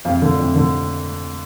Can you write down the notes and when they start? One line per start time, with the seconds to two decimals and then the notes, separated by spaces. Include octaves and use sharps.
0.05 F2 F5
0.22 D3
0.40 F2
0.56 D3